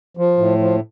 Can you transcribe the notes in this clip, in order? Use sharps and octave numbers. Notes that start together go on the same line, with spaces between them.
F3
A2
F3